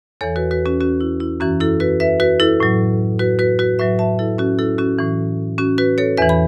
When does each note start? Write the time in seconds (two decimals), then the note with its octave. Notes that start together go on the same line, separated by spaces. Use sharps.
0.21 E2 E3 A4 C#5
0.36 F#4 B4
0.51 F#4 B4
0.66 C#4 F#4
0.81 C#4 F#4
1.01 E4
1.20 E4
1.40 F#2 E3 C#4 F#4
1.60 E4 A4
1.80 F#4 B4
2.00 B4 E5
2.20 F#4 B4
2.40 E4 A4
2.60 A2 F#3
3.19 F#4 B4
3.39 F#4 B4
3.59 F#4 B4
3.79 A2 F#3 B4 E5
3.99 E5 A5
4.19 E4 A4
4.38 C#4 F#4
4.59 E4 A4
4.78 C#4 F#4
4.99 A2 E3
5.58 C#4 F#4
5.78 F#4 B4
5.98 A4 C#5
6.17 E2 E3 B4 E5
6.29 B5